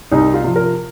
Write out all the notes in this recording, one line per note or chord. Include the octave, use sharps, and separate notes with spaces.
C2 D#4
F4
C3 F3
A#4